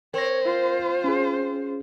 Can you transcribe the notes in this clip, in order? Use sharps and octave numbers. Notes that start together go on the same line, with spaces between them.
C4 A#4 C#5 A#6
F4 C5
C#4 G#4